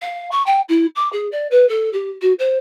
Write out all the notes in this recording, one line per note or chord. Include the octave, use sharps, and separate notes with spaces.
F5
C#6
G5
E4
D6
G#4
D5
B4
A4
G4
F#4
C5